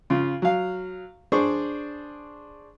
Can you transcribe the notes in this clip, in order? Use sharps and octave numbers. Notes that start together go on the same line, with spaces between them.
C#3 F4
F#3 F5
D4 G#4 C5 D5 C#6